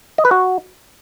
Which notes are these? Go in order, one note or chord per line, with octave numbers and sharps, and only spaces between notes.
D#5
B4
F#4